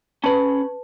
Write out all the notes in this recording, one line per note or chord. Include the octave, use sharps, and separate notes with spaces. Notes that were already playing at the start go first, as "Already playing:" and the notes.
C#4 B4 A5 B5